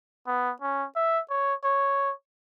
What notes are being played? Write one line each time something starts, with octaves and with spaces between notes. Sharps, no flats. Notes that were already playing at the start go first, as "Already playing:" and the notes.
B3
C#4
E5
C#5
C#5